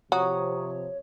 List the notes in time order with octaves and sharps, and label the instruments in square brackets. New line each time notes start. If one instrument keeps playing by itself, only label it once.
[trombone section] C3 F3 [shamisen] F#4 [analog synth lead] C#5 [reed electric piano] A#5 C#6 D#6